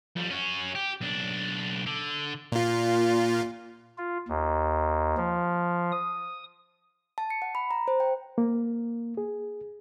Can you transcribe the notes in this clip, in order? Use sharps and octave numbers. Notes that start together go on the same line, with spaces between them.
F2 G3
C#4 F#4
G4
B1 D4
D3
A#2 F4
F4
D#2
F3
D#6
A5
C#7
F#5
B5
A#5
C5
G5
A#3
G#4